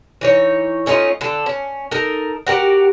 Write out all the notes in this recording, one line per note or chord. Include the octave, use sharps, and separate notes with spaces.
E3 D#4 C#5
A3 C#4 D#4 F4
D3 A4
C#4
D#4 A4 A#4
F#4 G4 A#4